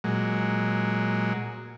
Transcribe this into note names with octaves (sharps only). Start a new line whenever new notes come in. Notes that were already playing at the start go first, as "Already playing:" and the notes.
A#2 F#3 G#3